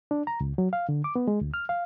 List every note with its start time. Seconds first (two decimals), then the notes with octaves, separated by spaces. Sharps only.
0.11 D4
0.27 A#5
0.41 C#2
0.58 F#3
0.73 F5
0.89 D3
1.04 D6
1.16 B3
1.28 G#3
1.41 D2
1.54 F6
1.69 F5